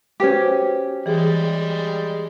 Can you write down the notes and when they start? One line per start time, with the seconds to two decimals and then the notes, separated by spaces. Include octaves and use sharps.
0.20 C#4 F#4 G4 B4 C5
1.06 E3 G3 G#3 G#4